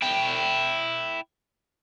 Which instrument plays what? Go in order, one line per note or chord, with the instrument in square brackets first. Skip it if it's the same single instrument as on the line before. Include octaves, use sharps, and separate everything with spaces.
[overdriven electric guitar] E4 G5